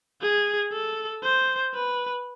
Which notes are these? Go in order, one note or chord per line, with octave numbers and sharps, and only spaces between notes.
G#4
A4
C5
B4